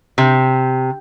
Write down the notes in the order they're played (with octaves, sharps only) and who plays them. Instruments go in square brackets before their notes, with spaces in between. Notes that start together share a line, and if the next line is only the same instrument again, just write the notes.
[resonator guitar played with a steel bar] C3